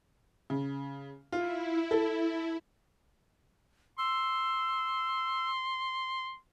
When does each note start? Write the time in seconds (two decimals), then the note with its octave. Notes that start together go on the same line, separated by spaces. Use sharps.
0.50 C#3
1.32 E4 F4
1.91 A4
3.98 C6 E6